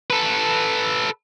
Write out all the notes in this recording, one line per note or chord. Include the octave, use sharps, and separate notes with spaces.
A4 B4